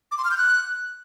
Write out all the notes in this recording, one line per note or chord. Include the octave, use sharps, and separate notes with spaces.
D6
C6
F6
G6
F#6